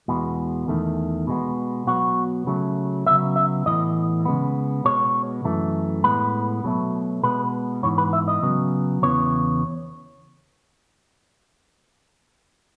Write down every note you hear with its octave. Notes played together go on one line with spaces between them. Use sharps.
E2 B2 G#3 B3
E2 D#3 A3
B2 G#3 B3
B2 F#3 B3 F#4
C#3 F#3 A3
C#3 F#3 B3 E5
E5
A2 E3 B3 D#5
C#3 G#3 B3
B2 G#3 B3 C#5
F#2 E3 A3
A2 G#3 B3 B4
B2 F#3 A3
B2 G#3 B3 B4
G#2 E3 B3 C#5
B4
E5
D#5
C#3 F#3 B3
E2 C#3 E3 B3 C#5